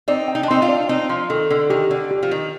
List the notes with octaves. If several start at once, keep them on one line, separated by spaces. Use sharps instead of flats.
C4 D#4 D5
G5
D#4
D4
C4 D#4 C6
D4 F4
D5
C4 D#4 D5
F3 C6
D#3 A4
D3 A4
D#3 G4
D3 D5
G4
F3
D#3 D5